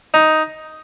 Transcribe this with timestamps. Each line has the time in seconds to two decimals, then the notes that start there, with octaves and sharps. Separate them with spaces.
0.14 D#4